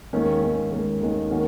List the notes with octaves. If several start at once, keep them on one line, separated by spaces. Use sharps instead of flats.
D#2 D#3 G#3 C#4
D#2 D#3 G#3 C#4
D#2 D#3 G#3 C#4
D#2 D#3 G#3 C#4
D#3 A#3 C#4 F#4